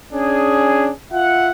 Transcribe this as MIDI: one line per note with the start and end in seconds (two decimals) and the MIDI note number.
0.13 0.91 61
0.13 0.91 62
0.13 0.91 68
1.12 1.50 65
1.12 1.50 76
1.12 1.50 78